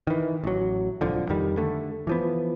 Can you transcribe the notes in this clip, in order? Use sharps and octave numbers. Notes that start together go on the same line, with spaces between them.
D#3 E3
A1 F#3
D1 C2 D3 F3
F2 D#3 G3
D3 A3
E3 F3 B3